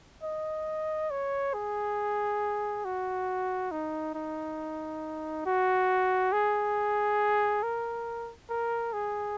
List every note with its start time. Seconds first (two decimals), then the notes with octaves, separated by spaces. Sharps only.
0.23 D#5
1.11 C#5
1.54 G#4
2.85 F#4
3.71 D#4
4.15 D#4
5.46 F#4
6.33 G#4
7.63 A#4
8.49 A#4
8.93 G#4